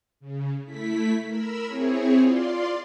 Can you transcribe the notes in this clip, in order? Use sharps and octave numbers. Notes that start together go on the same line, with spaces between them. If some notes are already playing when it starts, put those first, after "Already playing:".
C#3
A3 E4 B6
A#4 B5 E6
C4 E4 G#4 C#5
F4 D5 C6